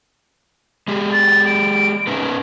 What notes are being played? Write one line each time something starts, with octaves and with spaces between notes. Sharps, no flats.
G#3 G4 G#4
A6
D7
C#4 D#4 B4